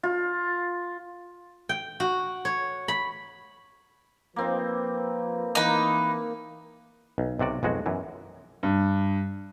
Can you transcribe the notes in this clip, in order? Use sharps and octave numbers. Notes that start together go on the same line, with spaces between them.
F4
G5
F#4
C#5
B5
F3 A#3 C4 D#4 B4
E3 A#3 D#4 B4
B1
B1 C3 F#4 D5
B1 F2 G#3 F#4
F#2 E3
G2